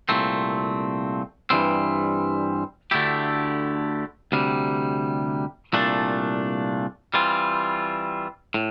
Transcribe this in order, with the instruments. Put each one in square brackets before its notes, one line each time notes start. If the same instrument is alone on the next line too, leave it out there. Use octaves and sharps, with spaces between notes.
[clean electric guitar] C2 A#2 A3 C4
G2 E3 G3 C4
D2 D3 A3 E4 G4
D2 C3 G3
C2 A#2 A3 D4
E3 G3 C4 F4
A2